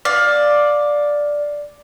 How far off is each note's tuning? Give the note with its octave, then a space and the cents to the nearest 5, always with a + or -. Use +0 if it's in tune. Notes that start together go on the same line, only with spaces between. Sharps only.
D5 +0 F5 +15